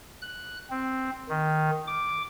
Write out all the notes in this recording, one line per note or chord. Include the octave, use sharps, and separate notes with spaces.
F#6
C4
D#3
D6